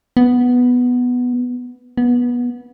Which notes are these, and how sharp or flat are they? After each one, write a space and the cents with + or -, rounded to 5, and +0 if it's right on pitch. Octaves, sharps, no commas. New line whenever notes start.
B3 +0
B3 -20